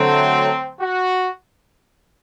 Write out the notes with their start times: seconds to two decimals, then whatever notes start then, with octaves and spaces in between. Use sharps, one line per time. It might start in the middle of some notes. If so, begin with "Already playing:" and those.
Already playing: D3 F#3 A3 C4
0.79 F#4